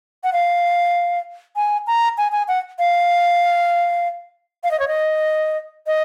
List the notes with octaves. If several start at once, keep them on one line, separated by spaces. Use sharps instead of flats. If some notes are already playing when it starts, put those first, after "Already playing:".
F#5
F5
G#5
A#5
G#5
G#5
F#5
F5
F5
D#5
C#5
D#5
D#5